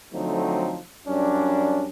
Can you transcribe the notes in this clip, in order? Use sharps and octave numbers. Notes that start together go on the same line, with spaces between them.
D3 F3 F#3 A3 C4 D#4
F#2 G3 C#4 D4